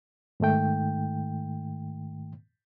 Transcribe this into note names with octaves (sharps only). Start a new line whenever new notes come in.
G#2 D#3 A3 G5